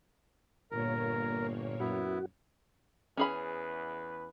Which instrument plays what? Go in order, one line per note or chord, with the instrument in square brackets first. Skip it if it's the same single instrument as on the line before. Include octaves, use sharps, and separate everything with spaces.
[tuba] G1 [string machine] A#2 A#3 C#5 [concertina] A#4
[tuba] F#2 [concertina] B3 E4 [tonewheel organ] F#4
[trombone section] E2 B4 [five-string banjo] C#4 G#4 B5